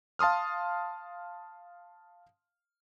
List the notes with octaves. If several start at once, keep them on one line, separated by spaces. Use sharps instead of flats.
F5 A5 C6 D#6 F6